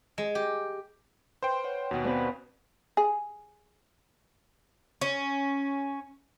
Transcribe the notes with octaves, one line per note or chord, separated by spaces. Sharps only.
G#3
G4
B4 C5 G5 C6
B4 C#5 F#5
D#2 B2 F#4 F#5 G#5
B3 C4 B4 D5 F5
G#4
C#4